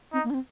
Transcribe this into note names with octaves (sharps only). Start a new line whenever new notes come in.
C4 D#4
A#3
D4
C4